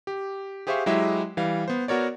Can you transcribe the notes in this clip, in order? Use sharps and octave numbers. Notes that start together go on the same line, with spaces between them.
G4
G4 G#4 C5 E5 F5 C#6
F#3 G#3 E4 G4 D#5 E5
E3 G3 F5
B3 C5
B3 F#4 A#4 C#5 D5